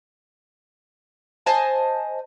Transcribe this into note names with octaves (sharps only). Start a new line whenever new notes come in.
C5 D#5 G#5 A5